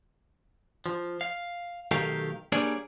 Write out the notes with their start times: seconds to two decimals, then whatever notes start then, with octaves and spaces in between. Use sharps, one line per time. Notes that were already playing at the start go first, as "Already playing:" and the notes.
0.86 F3
1.21 F5
1.91 B1 D#3 A3 G4 A#4 F5
2.52 G3 A#3 D4 G#4 C#5 D5